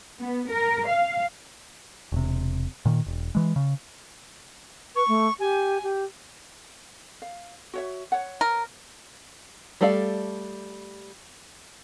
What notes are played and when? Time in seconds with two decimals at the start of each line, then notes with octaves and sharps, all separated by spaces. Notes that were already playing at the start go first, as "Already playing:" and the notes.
0.20 B3
0.50 A#4
0.88 F5
2.12 E1 C3
2.85 A#2 D#3
3.06 E1
3.35 E3 G#3
3.56 C#3
4.95 B4 C#6
5.08 A3
5.40 G4 G#5
5.83 G4
7.22 F5
7.74 F#4 C#5 E5
8.12 C#5 F#5
8.41 A#4
9.81 G3 A3 A4 D5 F5